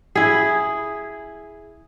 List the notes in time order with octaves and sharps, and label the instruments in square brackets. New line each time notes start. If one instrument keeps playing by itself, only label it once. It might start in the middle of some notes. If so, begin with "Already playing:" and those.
[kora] E4 G#4